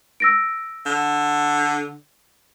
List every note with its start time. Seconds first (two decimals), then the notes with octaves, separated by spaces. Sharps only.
0.20 E6 A#6 D7
0.86 D3